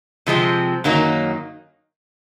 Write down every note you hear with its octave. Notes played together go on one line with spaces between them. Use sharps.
C3 F3 G#3 C4
F#2 D#3 F#3 A#3 D#4